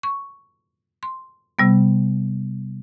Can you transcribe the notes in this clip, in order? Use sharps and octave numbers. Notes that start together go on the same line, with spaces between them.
C#6
C6
C3 G3 B3